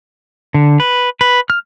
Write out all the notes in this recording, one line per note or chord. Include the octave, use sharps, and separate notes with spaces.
D3
B4
B4
F6